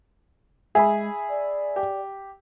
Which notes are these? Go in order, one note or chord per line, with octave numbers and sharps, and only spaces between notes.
G#3 G#4 E5 G#5 B5
D5
G4